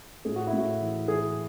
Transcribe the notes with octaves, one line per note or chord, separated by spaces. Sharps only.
A2 G#4
F#4
E4
A2 F#4
E3
E3 G#4